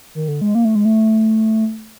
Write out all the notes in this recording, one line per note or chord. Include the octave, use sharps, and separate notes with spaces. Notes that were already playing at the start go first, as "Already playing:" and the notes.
D#3
D3
G#3
A#3
A3
G#3
A3